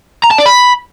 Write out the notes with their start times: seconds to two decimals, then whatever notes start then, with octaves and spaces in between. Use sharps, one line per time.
0.24 A#5
0.31 A5
0.38 D5
0.46 B5